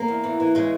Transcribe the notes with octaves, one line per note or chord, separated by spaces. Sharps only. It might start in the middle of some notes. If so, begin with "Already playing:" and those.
Already playing: A#3
E2
E3
E3
C#3 G#3